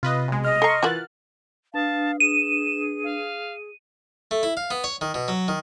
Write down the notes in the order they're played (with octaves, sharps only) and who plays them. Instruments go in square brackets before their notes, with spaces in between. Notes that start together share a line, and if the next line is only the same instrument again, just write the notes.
[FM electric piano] C3 [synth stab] F4 B4 D#5
[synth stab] B1 G#3
[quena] D#5 [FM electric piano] F6
[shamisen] A4 A#5 [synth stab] C6 C#6
[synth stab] E3 F#6 A6 [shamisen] F4 F#4 A#4
[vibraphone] D4 B4 D#6 [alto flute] F5 [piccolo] A5
[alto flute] G#4 [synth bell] D#7 [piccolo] E7
[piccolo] F5
[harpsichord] A3
E4
F5
B3
C#5
D#3
B2
F#3
D#3